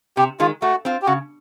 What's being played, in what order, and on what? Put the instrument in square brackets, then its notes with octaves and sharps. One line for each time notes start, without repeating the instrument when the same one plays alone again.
[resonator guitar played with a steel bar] C3 [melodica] G4
[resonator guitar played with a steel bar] D#3 G#3 [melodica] F4
[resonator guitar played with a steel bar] A3 [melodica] F#4
[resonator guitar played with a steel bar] C4 F4
[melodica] G4
[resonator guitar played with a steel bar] C#3 [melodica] F#4